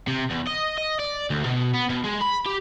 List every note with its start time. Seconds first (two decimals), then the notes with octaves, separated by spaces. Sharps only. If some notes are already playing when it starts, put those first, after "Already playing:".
0.07 C3
0.30 E2
0.47 D#5
0.78 D#5
0.99 D5
1.30 D2
1.45 B2
1.74 B3
1.90 B2
2.05 G#3
2.22 B5
2.46 G4